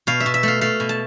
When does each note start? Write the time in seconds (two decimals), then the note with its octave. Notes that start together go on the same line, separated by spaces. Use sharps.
0.07 B2 F5
0.20 E5
0.26 B2
0.34 E5
0.43 A3 F5
0.61 A3 F5
0.80 B2
0.89 A5